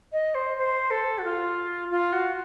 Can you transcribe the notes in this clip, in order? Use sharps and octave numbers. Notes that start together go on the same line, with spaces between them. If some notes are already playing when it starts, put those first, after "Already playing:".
D#5
C5
C5
A4
F#4
F4
F4
F#4